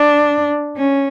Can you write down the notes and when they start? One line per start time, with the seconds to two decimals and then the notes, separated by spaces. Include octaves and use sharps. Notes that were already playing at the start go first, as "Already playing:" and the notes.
Already playing: D4
0.77 C#4